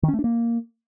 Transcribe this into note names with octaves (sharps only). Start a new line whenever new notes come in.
D#3
C#4
A3
D4
A#3